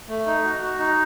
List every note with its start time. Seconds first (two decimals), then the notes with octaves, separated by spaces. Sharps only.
0.09 A3
0.26 D#4
0.44 F#4
0.61 F#4
0.79 D#4